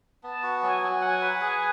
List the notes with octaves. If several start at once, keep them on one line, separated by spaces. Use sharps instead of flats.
B3 A5
F#4
F#3 G#5
F#3
F#5 G#5
B4
G#4 G#5